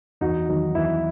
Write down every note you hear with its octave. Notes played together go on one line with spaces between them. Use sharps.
E2 D#4 F#4
D#3 F#3 D#4
E2 E4